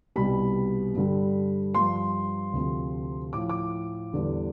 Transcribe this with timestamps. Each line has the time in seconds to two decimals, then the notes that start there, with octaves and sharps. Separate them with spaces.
0.16 C2 B2 G3 B5
0.95 G2 D3 G3
1.74 G2 F3 C6
2.53 D2 C3 F3
3.33 A2 F3 D6
3.49 D6
4.13 E2 D3 G3